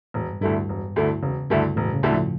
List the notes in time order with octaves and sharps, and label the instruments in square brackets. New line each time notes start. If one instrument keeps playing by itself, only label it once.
[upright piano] E1 [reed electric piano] A2
[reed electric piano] G2
[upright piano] D2 D3 A3 E4 [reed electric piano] G2
[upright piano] E1
D2 D3 A3 E4
[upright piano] E1 [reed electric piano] C#3
[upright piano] D2 D3 A3 E4 [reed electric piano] G2
[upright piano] E1 [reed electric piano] A2
[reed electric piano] C#3
[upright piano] D2 D3 A3 E4
[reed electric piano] F3